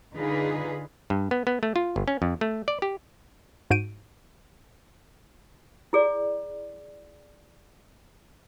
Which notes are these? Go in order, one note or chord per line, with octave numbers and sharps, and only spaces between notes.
D3 D#4 F4 G#4 B4
G2
B3
B3
A3
F4
G1
C#4
F2
A3
D5
G4
G#2 F#4 G6 D7 D#7
E4 G#4 D5